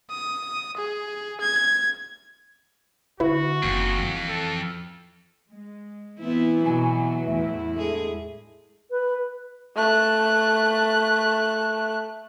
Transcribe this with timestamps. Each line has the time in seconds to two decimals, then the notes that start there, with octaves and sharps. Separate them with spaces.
0.10 D#6
0.77 G#4
1.41 G#6
3.20 D3 E4 F#4 B4
3.63 F#1 F2 D#3
3.98 E3 F3
4.29 A4
5.49 G#3
6.20 E3 B3 C4 E4
6.64 B2 F#3 G#5
7.26 E2 A2 E4 E5
7.75 G#3 D4 G#4 A4
8.91 B4
9.76 A3 F#6